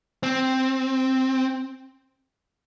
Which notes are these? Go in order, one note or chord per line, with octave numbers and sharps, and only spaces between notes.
C4